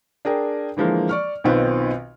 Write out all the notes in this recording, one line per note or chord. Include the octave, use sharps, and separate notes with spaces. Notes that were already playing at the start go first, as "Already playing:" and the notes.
D4 G#4 A#4 G5
D3 E3 F3 G#3 A#3
D5 C#6 F6
B1 B2 D#3 C4 F4 B4